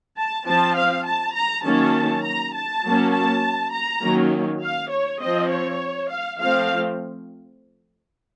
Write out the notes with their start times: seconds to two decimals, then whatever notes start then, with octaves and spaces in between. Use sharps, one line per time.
0.17 A5
0.47 F3 C4 A5
0.76 F5
1.07 A5
1.35 A#5
1.65 D#3 F#3 A#3 C#4 A5
2.25 A#5
2.54 A5
2.84 F#3 A#3 C#4
3.13 A5
3.73 A#5
4.02 D#3 F#3 A#3 C#4
4.62 F5
4.91 C#5
5.21 F3 C4 D#5
5.50 C#5
6.10 F5
6.39 F3 A3 C4 F5